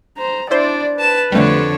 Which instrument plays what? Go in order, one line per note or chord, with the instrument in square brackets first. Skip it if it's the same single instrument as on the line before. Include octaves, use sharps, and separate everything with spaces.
[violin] C5 [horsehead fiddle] A#5
[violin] D4 [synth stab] E4 C5 [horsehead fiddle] D5
[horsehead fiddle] B4 [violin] A5 E7
[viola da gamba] F2 D3 [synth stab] G3 A3 [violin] A4 C#5